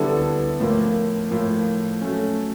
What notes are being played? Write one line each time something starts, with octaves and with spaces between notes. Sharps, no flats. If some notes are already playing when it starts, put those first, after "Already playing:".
Already playing: D3 G3 B3 E4 A4
A2 F3 A#3
A2 F3 A#3
F#3 A3 C#4